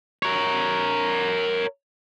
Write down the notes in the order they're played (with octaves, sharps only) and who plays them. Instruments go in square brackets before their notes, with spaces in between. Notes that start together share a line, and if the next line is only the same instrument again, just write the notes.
[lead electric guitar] A#4 C#5